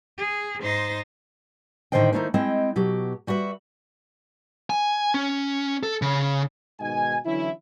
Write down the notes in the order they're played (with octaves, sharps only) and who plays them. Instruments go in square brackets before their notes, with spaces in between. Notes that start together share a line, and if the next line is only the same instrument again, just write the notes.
[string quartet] G#4
G#2 D#4 C5 C6 A6 A#6
[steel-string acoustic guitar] A2 D3 D#3 C5 D#5 G5
D#3 G#3 A3 D#4 E4 C5
G#3 C4 E4 D#5 G5
B2 F#3 G4
G3 F#4 B4 E5
[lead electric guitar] G#5
C#4
A4
C#3
[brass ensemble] G#2 B2 D#3 D#5 G#5
D3 E3 F#3 C#4 E4